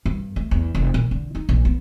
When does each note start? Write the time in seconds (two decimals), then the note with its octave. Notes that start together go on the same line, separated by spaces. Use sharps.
0.06 G2
0.36 A3
0.51 E2
0.75 F1
0.94 A#2
1.11 D3
1.35 D#4
1.49 A#1
1.65 B3